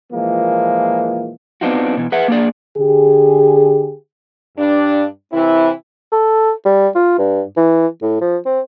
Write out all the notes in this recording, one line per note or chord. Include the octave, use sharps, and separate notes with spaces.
A#2 E3 F3 G#3 A#3
B3 C4 D4 D#4 F4 F#4
B2 E3
G#4 B4 E5 F#5
A#3 D4 G#4 D5
D3 G4 G#4
G2 D4
C3 E3 C4 E4
A4
G3
F4
G2
E3
A2
F3
C4